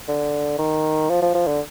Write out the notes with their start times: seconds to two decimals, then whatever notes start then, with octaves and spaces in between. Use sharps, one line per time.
0.08 D3
0.58 D#3
1.10 F3
1.22 F3
1.34 F3
1.47 D3